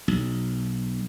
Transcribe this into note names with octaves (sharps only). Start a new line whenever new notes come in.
B1